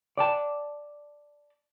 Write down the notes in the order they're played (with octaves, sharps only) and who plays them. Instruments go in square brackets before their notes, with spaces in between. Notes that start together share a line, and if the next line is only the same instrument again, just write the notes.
[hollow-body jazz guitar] D5 G5 A5